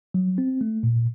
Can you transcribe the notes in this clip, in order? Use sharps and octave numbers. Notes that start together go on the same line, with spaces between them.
F#3
C4
A3
A#2